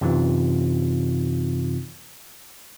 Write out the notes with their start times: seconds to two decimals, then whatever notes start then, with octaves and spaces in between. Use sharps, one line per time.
0.01 F#2 C3 E3 C4 D#4 F4